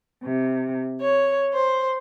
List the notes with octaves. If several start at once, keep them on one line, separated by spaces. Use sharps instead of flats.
C3
C#5
C5